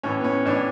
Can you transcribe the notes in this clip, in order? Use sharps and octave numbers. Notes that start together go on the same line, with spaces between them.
A2 E3 C#4
B3
C#4
A2 E3 D4